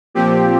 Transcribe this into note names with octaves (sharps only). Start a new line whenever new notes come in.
A#2 F3 C4 G4